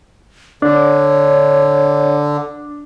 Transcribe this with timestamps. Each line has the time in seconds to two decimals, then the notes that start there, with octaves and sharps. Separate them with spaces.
0.62 D3 D4 C#5